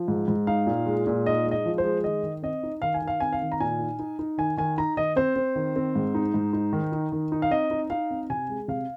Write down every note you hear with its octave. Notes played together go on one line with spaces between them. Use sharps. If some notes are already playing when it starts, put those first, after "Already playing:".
Already playing: F3
G#2
G#2
D#4 F5
A#2
G#3
A#2
D#4 D#5
G#3
D#5
F3
C5
G#3
D#3 D#5
D#3
C4 D#5
D#4
D#3 F5
G#5
D#3
F5
C4 G#5
F5
D#3
A#5
A#2 G#5
D#4
D#4
D#4
D#3 G#5
D#3 G#5
D#4 A#5
D#3 D#5
C4 C5
C4
D#3
C4
G#2
D#4
G#2
D#4
D#3
D#4
D#3
D#4
F5
C4 D#5
D#4
D#4 F5
C4
C3 G#5
G#3
C3 F5